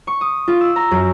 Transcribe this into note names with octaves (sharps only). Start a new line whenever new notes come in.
C#6
D#6
F4
E6
A#5
F#2